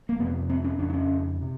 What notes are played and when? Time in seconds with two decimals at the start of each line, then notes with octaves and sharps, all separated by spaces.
0.09 A#3
0.19 F2 C3 B3
0.50 C4
0.64 C#4
0.78 F2 C#3 D4
0.90 D4
0.94 C#4
1.41 C3